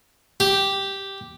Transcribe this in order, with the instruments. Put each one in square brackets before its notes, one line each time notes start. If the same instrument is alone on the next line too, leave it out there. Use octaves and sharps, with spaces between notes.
[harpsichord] G4